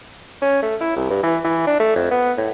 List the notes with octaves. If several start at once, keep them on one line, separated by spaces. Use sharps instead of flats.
C#4
A3
E4
C2
G2
E3
E3
D4
A3
F2
B3
A2